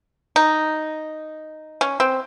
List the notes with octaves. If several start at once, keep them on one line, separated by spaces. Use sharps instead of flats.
D#4
C#4
C4